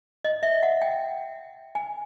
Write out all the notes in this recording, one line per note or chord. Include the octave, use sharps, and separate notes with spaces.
D#5
E5
F#5
G5
G#5